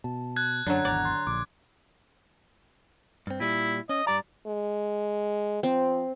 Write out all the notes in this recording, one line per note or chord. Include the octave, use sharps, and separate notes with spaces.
B2 A5
F#6 G#6
F#2 D3 F#3 F#5 A#5 A6
G#1 E2 C#5 D5 A#5
C6 A6
A#1 D6
G2 C4
A#2 G3 E4
C#4 D#5
G2 G3 D5 A#5
G#3
F3 C4